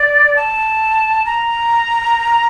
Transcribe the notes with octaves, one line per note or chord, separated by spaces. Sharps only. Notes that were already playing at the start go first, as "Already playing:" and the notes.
Already playing: D5
A5
A#5